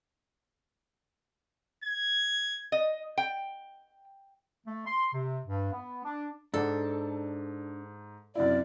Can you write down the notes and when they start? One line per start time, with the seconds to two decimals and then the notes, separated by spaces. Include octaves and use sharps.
1.84 G#6
2.72 D#5
3.18 G5
4.67 A3
4.86 C6
5.13 C3
5.46 G2
5.72 B3
6.04 D4
6.54 G#2 D4 A4 D6
8.35 F#2 C3 E4 D5